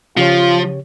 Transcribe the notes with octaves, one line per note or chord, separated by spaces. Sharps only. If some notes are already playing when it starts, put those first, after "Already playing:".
C#3 F3 F4 G4 C#5